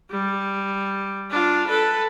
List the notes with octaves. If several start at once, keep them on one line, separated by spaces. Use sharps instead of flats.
G3
D4 F4
A4 B4